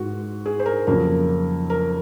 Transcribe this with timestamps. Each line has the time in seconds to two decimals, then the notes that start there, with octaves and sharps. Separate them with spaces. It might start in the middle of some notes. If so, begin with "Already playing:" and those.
Already playing: G#2 G#3 F#4
0.46 G#4
0.59 C5
0.66 A#4
0.87 F2 C#3 F#3 A#3 A#4
1.70 A#4